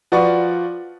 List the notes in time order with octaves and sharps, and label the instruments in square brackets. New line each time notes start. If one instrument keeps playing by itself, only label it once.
[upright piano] F3 F#4 B4 D5 C#6